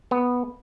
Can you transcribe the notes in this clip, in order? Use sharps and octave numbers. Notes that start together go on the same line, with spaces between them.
B3